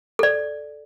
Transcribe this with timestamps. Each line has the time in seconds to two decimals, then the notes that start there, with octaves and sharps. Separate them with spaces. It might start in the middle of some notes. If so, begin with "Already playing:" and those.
0.19 A4 D5